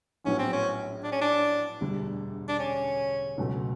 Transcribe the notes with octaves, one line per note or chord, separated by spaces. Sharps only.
A#1 A2 F#3 B3 C#4
C4
C#4
D4
C#4
D4
E1 D2 D3 G3
D4
C#4
C#2 B2 F#3 A3